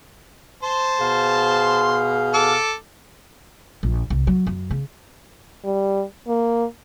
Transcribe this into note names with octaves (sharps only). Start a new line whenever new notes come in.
C5 A5 C6
B2 G#4 F5
A4 D6
A#1
C2
F#3
F#2
C#3
G3
A#3